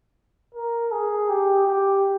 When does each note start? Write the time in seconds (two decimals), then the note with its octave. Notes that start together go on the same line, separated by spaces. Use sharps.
0.55 A#4
0.92 G#4
1.29 G4
1.67 G4